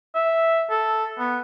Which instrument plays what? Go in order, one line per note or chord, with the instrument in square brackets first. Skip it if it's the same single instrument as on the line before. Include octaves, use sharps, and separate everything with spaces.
[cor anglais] E5
A4
B3